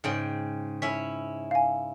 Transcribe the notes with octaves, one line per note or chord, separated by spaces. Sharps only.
G#2 C#3 G5
C#4 E4 B6
F5 G#5